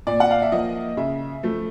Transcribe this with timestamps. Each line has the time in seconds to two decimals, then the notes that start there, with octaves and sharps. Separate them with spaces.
0.07 A#2 D5
0.20 F#5
0.31 F5
0.42 E5
0.52 F3 A#3 D#5
0.97 C#3 E5
1.43 F3 A3